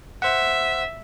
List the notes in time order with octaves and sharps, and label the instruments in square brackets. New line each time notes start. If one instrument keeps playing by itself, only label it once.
[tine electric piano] C5 F#5 [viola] E5